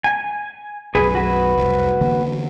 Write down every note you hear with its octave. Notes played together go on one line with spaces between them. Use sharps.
G#5
B1 F#2 G#4 B4 G#5
F#4 B4
F1 C2
D3 E3 A#3